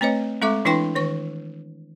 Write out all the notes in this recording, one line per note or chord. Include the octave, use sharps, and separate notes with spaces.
A3 C4 B4 C#5 D#5
G#3 C4 A4 E5 C#6 D6
E3 D4 E4 B4 G5 C6
D#3 B4 C#6